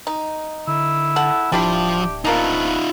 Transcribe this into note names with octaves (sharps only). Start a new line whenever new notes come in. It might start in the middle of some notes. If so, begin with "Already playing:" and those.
D#4
D3 E4
A4 F#5
D1 F3 G3 D4 E4 G4
F3 A#3 B3 D4 D#4 F4